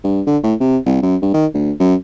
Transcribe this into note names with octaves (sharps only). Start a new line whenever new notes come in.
G2
D3
A2
C3
C2
F#2
G2
D#3
D2
F#2